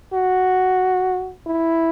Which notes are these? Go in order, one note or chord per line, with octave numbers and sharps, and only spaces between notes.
F#4
E4